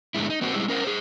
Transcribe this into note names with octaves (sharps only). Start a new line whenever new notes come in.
G#2 D3 G#3 A3 E4
D#4
A#3 C4 F#4
G3 G#3 C4 E4
C#4 A#4 C5 F#5
G#4 C5